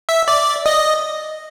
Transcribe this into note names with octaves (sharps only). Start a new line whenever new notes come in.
E5
D5
D#5